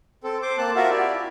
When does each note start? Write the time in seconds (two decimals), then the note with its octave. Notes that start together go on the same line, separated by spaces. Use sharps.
0.24 C4 A4
0.42 C5 D6
0.58 A#3 C4 A5 F#6
0.76 F4 F#4 A#4 E5 F#5
0.90 E4 G4 D5
1.13 E4